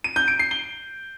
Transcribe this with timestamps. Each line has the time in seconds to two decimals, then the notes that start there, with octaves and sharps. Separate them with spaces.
0.04 D#7
0.16 G6
0.28 D7
0.39 C7
0.51 G7